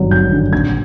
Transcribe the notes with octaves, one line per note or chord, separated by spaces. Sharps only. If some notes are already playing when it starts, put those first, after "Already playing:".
Already playing: G#1 G2 D3 F#3
G#1 G6
G2 D3 F#3
A#1 G#6